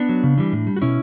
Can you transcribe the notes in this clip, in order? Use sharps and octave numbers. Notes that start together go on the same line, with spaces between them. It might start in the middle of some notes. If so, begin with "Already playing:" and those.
Already playing: B3 D4
F#3
C#3
E3 G3
A2
G3
F#4
B2 C#4 E4